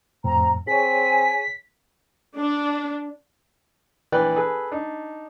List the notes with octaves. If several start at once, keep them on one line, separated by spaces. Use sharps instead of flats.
F2 A2 C4 A#5
C4 G#4 C#5 G#5 B6
D4
A#1 E3 B4 D5 G5 F#6
G#4 A4 B4
D4 D#4